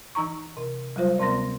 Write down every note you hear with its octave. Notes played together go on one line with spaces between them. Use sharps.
E3 D#4 A#5 C#6
C3
F#3 G3 F4 C5
D2 C3 B3 C6 A#6